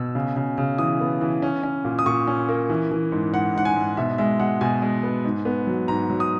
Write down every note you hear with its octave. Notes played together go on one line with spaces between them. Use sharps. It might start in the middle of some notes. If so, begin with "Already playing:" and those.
Already playing: B2 E6
C#3
C#3
C#3
E3 D#6
B3
E3
C#4
C#4
A#2
D#6
A#2 C#6
C#4
A#3
E3
E3
G#2
G#2 F#5
G#2 F#5
G#5
G#2
B2 E5
G#3 E5
G#3 F#5
B2 G#5
G#3
B3
G#2
B3
F#3
G#2 A#5
F#3
D#6